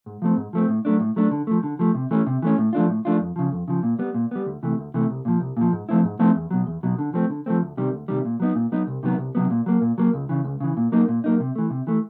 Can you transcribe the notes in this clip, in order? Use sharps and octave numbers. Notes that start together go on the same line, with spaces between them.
G#2
F3 A3 C4
G#2
F3 A3 C4
A2
F#3 A3 D4
A2
F#3 A3 D4
D3
F3 A3
D3
F3 A3
C3
E3 A3 C#4
C3
E3 A3 C#4
A2
F3 A3 D4 F4
A2
F3 A3 D4 F4
F2
C#3 F3
F2
C#3 F3
A#2
G3 B3
A#2
G3 B3
D2
C3 E3 A3
D2
C3 E3 A3
C2
A#2 F3
C2
A#2 F3
G#2
F3 A3 C4 E4
G#2
F3 A3 C4 E4
E2
B2 F#3
E2
B2 F#3
D3
F3 A3 C4
D3
F3 A3 C4
D2
C3 D#3 G3
D2
C3 D#3 G3
A#2
F#3 B3 D#4
A#2
F#3 B3 D#4
C2
C3 D#3 F#3 B3
C2
C3 D#3 F#3 B3
A#2
F#3 A#3
A#2
F#3 A#3
C#2
C#3 E3
C#2
C#3 E3
A#2
F#3 A#3 D#4
A#2
F#3 A#3 D#4
C3
E3 A3
C3
E3 A3